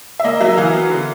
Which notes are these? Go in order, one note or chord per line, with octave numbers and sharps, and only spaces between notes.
E5
A#3 D#5
F#3 E5
E3 F5
B3
D3